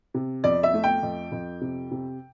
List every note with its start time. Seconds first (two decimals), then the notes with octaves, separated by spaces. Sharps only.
0.14 C3
0.44 F2 D5
0.63 E5
0.74 A3
0.84 G5
1.03 F2
1.32 F2
1.61 C3
1.91 C3